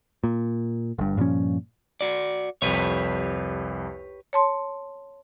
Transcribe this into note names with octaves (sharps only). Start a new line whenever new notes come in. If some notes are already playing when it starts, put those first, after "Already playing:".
A#2
G1 G2
G2 A#2 F3 C#4
F#4 D5
C2 F2 G4 B4 C#5
C#5 A5 C6